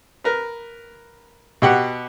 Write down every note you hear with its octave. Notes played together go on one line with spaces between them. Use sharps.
A#4 B4
B2 G4 F#5